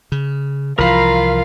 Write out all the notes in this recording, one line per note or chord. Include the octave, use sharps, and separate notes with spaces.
C#3
C2 E3 F3 F4 A#4 F5 B5